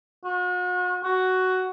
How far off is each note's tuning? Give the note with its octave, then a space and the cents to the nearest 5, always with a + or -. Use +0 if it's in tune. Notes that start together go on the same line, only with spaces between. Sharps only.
F#4 -40
F#4 +10